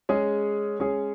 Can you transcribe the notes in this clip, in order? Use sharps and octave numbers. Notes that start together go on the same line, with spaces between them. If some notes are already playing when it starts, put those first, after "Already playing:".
G#3 C#4 G#4
G#3 C#4 G#4